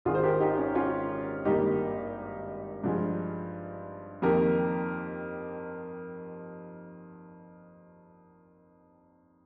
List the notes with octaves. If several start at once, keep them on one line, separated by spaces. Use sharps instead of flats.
G#1 G#2 D#3 F4 G#4
C5
G4 A#4
D#4 G4
C#4
C#4 F4
G#1 G2 G3 A#3 D#4 G4
G2 F3 G#3
F2 D#3 A#3 G4 A#4